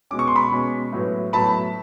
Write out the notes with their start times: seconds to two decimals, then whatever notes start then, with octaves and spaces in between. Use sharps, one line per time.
0.11 B2 G#3 C#4 D6
0.19 C#6
0.27 C6
0.36 B5 C#6
0.52 B2 G#3 C#4
0.92 A2 F#3 B3
1.33 A2 F#3 B3 A5 B5